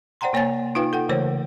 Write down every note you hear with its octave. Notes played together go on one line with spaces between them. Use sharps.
C5 D5 F#5 G5 A#5 C6
C3 A#3 C#5 F#5 G#5 A6
D#4 F4 B4 F5 G5
A4 F#5 G5
C#3 E3 A3 A#4 C5 C#5